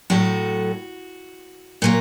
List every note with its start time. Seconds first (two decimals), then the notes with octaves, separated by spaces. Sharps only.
0.10 A2 F#3 A3 F#4
1.82 A#2 F#3 A#3